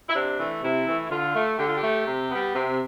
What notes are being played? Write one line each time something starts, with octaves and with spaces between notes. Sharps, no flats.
E4
C3 D4
E3 A3
C3 E4
E3 A3
E4
D3 F4
A3
D3 G4
F4
G4
A3
C3
G3 B3
C3